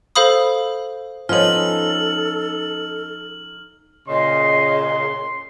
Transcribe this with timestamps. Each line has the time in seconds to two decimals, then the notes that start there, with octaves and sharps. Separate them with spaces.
0.15 A4 C5 F5 B5 D#6
1.29 F3 B3 C#4 D#4 A4 G#5 F6 F#7
4.08 A#2 C#3 D#5 C6